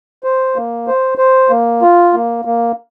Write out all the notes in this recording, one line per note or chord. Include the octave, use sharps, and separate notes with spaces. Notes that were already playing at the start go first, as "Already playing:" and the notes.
C5
A#3
C5
C5
A#3
F4
A#3
A#3